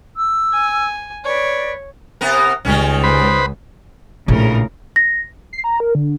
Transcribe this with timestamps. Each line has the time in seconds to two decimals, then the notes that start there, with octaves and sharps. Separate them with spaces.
0.16 E6
0.53 G#5
1.24 B4 C#5 D5
2.21 C3 B3 A#4
2.65 C#2 D#3 G3 C#4
3.04 B4 C5 B5
4.28 A#1 A2 C#3 A#4
4.96 A#6
5.53 C7
5.64 A#5
5.80 A#4
5.95 D3